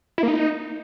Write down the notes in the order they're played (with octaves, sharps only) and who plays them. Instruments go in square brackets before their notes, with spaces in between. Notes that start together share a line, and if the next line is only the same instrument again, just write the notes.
[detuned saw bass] E4
A#3
D#4